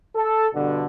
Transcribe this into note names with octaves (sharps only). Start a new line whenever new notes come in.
A4
G2 B2 D3